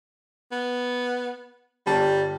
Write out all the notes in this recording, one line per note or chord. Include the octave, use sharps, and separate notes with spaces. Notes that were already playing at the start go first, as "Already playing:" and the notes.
B3
G1 G3 G4 A5